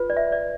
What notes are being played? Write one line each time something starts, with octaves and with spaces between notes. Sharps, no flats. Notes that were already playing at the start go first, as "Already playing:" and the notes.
Already playing: F4 B4
D5
E5
D5